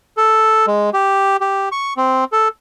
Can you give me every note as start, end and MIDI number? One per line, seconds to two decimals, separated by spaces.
0.17 0.66 69
0.67 0.90 56
0.94 1.37 67
1.41 1.69 67
1.72 1.93 85
1.97 2.24 60
2.32 2.48 69